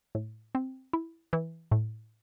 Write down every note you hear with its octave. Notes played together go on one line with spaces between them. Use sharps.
A2
C4
E4
E3
A2